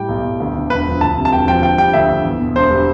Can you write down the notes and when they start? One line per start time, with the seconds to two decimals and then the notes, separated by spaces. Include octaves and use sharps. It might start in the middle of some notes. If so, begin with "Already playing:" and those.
Already playing: A2 G3 G5
0.09 B1
0.24 B1
0.40 D2
0.55 D3
0.70 E1 B4
0.86 F3
1.01 D2 A5
1.17 C3
1.25 A5
1.32 E1 G5
1.48 F3 G5
1.62 D3 G5
1.78 G3 G5
1.93 D2 E5
2.10 D2
2.25 E2
2.41 B2
2.56 E1 C5
2.71 G3